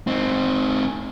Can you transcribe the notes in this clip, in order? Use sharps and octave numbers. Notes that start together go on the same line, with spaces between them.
C4 D#4